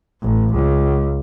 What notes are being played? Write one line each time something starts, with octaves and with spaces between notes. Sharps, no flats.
A1
C#2